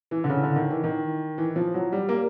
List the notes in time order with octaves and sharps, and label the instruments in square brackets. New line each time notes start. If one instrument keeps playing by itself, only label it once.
[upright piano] E3
D3
C#3
D3
D#3
E3
D#3
E3
F3
F#3
G3
A#3